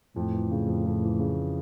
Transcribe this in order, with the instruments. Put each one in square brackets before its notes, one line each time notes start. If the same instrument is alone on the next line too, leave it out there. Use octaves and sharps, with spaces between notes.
[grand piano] F2 [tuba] A2
[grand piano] E3
C#3
F2
F2
E3
C#3